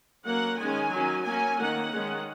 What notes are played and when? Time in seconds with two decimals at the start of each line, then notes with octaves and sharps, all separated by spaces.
0.24 F#3 A#3 C#4 F#5
0.58 D#3 G#3 C#4 G#5
0.92 D#3 F#3 C#4
1.25 F#3 A#3 C#4 G#5
1.59 D#3 A#3 C#4 F#5
1.92 D#3 G#3 C#4